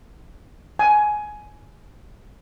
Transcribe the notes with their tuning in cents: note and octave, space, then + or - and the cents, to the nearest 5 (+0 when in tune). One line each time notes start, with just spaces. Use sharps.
G#5 +15